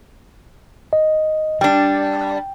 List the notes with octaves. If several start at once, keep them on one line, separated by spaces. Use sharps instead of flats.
D#5
G3 D4 G5